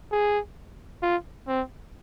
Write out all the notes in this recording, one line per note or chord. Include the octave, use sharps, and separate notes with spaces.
G#4
F4
C4